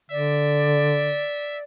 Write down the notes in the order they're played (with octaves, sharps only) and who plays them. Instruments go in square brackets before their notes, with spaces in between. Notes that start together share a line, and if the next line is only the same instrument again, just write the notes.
[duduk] D3 [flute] D5 [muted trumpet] E5